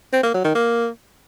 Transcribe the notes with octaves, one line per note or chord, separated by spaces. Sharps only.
C4
A#3
F#3
D#3
A#3